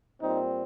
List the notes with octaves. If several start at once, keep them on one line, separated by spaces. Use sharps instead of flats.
A#2 G3 C4 D#4